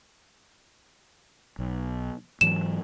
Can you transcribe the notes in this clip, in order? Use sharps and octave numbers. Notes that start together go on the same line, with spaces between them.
B1
G#2 E3 F#3 E7